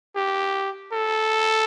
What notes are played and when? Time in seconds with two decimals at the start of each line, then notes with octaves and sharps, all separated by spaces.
0.16 G4
0.93 A4